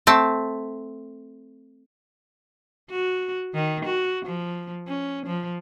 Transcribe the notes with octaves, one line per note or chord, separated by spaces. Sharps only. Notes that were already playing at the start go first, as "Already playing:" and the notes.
A3 C4 A5
F#4
D#3
F#4
F3
C#4
F3